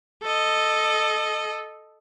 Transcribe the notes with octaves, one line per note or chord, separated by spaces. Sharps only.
A4 D#5